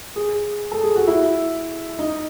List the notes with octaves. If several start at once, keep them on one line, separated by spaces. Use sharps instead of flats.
G#4
A4
G#4
F#4
E4
D#4